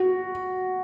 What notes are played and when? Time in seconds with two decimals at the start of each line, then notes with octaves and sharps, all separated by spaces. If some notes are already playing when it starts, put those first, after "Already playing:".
Already playing: F#4